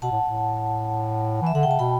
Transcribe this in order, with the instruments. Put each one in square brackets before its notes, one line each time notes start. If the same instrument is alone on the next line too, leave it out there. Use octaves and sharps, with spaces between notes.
[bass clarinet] B2 [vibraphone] F#5 A5
[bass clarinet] A2
A2
[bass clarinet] E3 [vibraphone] E5
[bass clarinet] D3 [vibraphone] F#5
[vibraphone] G5
[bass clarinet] C#3 [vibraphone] A5
[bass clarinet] B2 [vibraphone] G5 B5